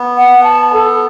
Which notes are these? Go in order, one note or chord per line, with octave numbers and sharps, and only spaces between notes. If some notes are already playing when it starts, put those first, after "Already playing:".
Already playing: B3
F#5
A5
A4